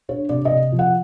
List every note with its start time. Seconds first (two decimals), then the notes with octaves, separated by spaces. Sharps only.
0.09 D4 C#5
0.29 C3 D5
0.45 D#5
0.51 C3
0.72 F3
0.79 F#5